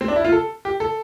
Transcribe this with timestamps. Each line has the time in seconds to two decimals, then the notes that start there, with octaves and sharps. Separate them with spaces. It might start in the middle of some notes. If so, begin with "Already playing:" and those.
0.01 C4
0.08 D4
0.16 E4
0.24 F4
0.32 A4
0.65 G4
0.80 A4